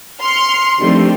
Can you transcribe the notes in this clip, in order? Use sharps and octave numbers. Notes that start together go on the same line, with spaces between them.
C6 F6 C#7
D#3 F3 G3 A3 C4 D4